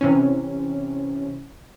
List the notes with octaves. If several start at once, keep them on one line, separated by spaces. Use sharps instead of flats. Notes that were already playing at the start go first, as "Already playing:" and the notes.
C3 E3 C#4